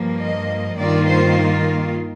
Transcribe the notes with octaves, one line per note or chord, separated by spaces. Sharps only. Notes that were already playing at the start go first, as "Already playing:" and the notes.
Already playing: G2 F3 A#3
D#5
G2 D#3 A#3 F4 D5
C5